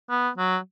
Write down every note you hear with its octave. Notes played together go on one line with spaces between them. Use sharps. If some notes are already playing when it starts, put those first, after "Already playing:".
B3
F#3